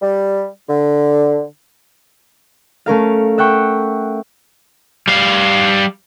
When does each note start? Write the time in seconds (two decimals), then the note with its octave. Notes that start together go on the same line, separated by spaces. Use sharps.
0.02 G3
0.68 D3
2.86 A3 C#4 A#4 F5
3.38 E5 F#5 G5 C#6
5.08 G3 F5